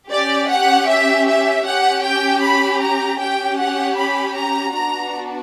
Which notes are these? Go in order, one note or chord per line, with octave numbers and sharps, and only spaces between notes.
C#4 G4 D5
F#5
E5
E5
C#4 G4 F#5
G5
B5
A#5
C#4 G4 G5
F#5
B5
A#5
B3 D4 F#4 A#5